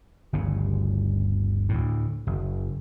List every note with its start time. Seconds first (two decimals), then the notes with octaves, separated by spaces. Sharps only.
0.33 G1 D2 C#3
1.69 D2 A2
2.27 F#1